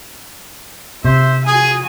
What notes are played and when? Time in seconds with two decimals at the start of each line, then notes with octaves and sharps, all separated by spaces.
1.05 C3 C5 E5
1.47 F#4 G#4 G#5